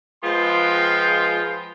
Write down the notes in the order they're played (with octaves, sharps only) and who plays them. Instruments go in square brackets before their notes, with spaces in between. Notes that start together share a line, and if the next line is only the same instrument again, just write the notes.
[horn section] F3 G#3 B3 F4 G5 C6